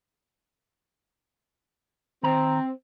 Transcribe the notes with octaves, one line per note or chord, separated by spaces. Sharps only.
D#3 C4 A#5